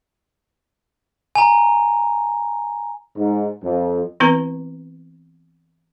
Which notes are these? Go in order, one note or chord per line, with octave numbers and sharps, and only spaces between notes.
G#5 A#5
G#2
F2
E3 B3 C4 E4 B4 A#5